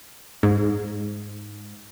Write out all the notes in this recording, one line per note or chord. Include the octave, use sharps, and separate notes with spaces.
G#2